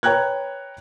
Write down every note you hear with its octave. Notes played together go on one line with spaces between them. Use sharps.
B4 C#5 G5 A#5 F#6 G#6